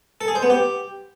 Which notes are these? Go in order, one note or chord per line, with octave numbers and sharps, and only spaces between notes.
A4
G#4
C5
B3
G4